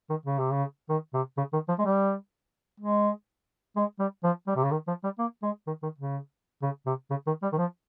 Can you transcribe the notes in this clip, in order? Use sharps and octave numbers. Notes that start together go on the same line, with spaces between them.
D#3
C#3
C3
C#3
D#3
C3
C#3
D#3
F3
G#3
G3
G#3
G#3
G3
F3
G3
C3
C#3
D#3
F3
G3
A#3
G#3
D#3
D#3
C#3
C#3
C3
C#3
D#3
G3
D#3
F3